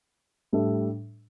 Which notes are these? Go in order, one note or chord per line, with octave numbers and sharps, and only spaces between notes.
A2 G3 D4 A4 E5